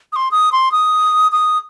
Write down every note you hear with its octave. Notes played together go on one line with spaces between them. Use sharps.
D#6
C6
D#6
C6
D#6
D#6